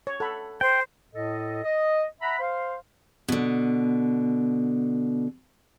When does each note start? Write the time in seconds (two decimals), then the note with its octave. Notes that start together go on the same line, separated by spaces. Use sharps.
0.07 C#5
0.20 A4 F#5 B5
0.61 C5 G5
1.14 A2 A4 D#5
1.64 D#5
2.21 E5 F#5 A#5 B5
2.39 C5 F5
3.28 B2 D3